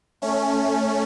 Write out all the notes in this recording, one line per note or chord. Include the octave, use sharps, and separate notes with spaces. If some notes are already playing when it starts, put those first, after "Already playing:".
A3 C#4